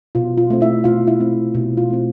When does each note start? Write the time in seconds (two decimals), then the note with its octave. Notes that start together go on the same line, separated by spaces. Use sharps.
0.15 B2 F4
0.38 F4
0.50 A3 C4
0.61 E4 E5
0.84 B2 F4 F5
1.07 E4 E5
1.20 A3 C4
1.55 B2 E4
1.77 F4
1.90 A3 C4